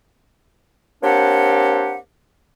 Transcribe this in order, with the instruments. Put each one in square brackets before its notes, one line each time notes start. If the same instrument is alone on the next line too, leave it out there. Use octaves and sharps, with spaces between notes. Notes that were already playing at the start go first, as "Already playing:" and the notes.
[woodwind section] A#3 C4 D4 G4 C#5 F#5